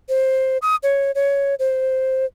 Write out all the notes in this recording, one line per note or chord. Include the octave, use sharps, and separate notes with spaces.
C5
D#6
C#5
C#5
C5